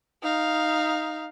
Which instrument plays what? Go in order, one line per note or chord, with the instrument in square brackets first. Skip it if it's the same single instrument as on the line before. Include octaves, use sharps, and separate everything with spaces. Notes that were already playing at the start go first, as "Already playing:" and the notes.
[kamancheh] D#4 F5